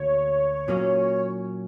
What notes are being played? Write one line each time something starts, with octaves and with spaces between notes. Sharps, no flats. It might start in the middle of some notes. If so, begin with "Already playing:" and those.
Already playing: D2 D3 A#3 D4 F#4 C#5
A#2 F#3 A#3 C#4